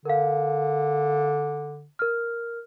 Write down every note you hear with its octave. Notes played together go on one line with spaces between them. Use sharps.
D3 A#4 F5
A#4 F6